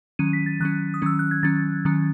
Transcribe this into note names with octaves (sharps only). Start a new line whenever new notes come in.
D#3 F#3 C#4 D#7
B6
A6
D#3 F#3 C#4 F#6
D#6
D#3 F#3 C#4 E6
F#6
G#6
D#3 F#3 C#4 A6
D#3 F#3 C#4